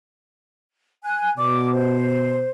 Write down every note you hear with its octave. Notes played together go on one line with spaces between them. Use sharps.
G#5 F#6
B2 D5 D6
C5